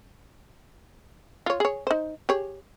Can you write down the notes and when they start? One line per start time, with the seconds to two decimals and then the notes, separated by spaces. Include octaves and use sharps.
1.46 F4 C#5
1.60 G#4 C#5
1.87 D#4 C5
2.29 G4 G#4 C#5